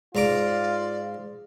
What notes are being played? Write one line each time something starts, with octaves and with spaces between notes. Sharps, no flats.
G#2 F4 D5 A#5 D6